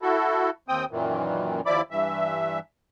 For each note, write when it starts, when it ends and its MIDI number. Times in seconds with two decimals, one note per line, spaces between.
0.02 0.50 64
0.02 0.50 66
0.02 0.50 69
0.68 0.85 39
0.68 0.85 60
0.68 0.85 79
0.68 0.85 87
0.91 1.61 42
0.91 1.61 46
0.91 1.61 51
0.91 1.61 52
1.66 1.81 39
1.66 1.81 53
1.66 1.81 64
1.66 1.81 74
1.66 1.81 83
1.66 1.81 86
1.91 2.59 43
1.91 2.59 52
1.91 2.59 76